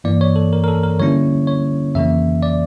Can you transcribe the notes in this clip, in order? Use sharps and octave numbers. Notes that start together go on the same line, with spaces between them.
G2 E3 A#3 E4 D5
C#5
A4
A#4
A#4
A4
A#4
D3 G3 A#3 C#4 E4 C#5
C#5
F2 C#3 E3 A#3 E5
D5